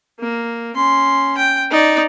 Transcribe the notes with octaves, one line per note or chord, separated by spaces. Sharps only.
A#3
C#4 C6
G5
D#4 D5